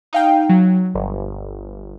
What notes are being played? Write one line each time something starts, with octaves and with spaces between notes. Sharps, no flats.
D#4 F5 G5
F#3
G1